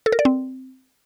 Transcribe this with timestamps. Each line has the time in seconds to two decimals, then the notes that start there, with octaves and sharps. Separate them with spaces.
0.06 A4
0.12 A#4
0.19 D5
0.25 C4